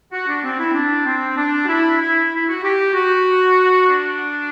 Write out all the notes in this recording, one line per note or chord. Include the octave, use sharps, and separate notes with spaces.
F#4
D4
C4
E4
C4
D4
C4
D4
F#4
E4
E4
E4
F#4
G4
F#4
D4